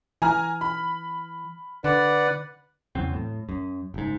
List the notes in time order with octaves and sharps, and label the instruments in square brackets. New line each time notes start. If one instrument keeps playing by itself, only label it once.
[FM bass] E3 [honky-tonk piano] G#5 A#5 F6
[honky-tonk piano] B5
[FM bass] D3 [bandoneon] B4 D5 F#5
[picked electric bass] E2 C#3 F#3 C4
A2
F#2
F#1 G#2